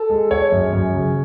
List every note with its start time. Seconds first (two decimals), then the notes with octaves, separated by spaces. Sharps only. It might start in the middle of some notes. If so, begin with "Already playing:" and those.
Already playing: A4
0.10 G#3
0.31 G#3 C#5
0.52 F#2
0.73 F#2
0.94 C#3